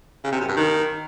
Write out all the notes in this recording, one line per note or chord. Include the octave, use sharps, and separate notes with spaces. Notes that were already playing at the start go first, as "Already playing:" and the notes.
C#3
C3
F#2
G2
D#3